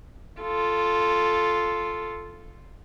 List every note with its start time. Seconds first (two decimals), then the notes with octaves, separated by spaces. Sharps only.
0.41 F4 A4